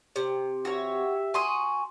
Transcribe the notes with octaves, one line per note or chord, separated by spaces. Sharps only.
C3
F#4 G4 C#5 E5
F#4 G#5 C6 D#6